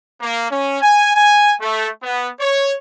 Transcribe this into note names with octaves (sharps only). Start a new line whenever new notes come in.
A#3
C#4
G#5
G#5
A3
B3
C#5